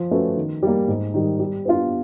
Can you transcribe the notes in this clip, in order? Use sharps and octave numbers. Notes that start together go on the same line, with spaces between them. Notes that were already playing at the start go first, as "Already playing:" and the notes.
Already playing: F3
A3 C#4 F#4 B4
D#3
G3 A#3
G#2
D#3 G3
G3
B3 D4 F4